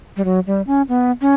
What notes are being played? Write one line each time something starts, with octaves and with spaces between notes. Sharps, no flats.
G3
F#3
G3
C#4
B3
C#4